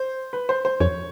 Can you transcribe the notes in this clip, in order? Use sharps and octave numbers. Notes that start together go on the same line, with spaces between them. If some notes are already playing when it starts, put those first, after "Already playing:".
Already playing: C5
B4
C5
C5
F2 C#5